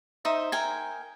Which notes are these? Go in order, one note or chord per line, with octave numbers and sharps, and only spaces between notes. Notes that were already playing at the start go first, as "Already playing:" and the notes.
D#4 C5 E5
A#4 G5 G#5